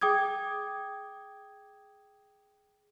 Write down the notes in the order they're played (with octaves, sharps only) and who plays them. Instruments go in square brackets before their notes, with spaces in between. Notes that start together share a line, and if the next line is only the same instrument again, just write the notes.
[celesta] G#4 G5 D6 D#6 G#6